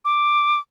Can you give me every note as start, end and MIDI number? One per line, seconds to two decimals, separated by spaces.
0.05 0.60 86